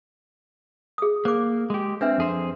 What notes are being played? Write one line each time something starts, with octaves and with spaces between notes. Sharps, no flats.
G#4 D#6
A#3 C5 D6
G#3 G4
C4 D4 B4 E5
F2 G#4 C5